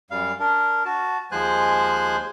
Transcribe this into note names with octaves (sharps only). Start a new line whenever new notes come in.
F#2 G3 F5
D4 A#4
F#4 A5
D#2 F3 G#3 C5 G#5 F#6